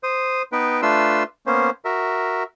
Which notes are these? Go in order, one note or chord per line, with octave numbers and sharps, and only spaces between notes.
C5 D#6
B3 D#4 B4 G5
A3 D4 F4 B4 C6 E6
A#3 B3 C#4 C5
F#4 A#4 E5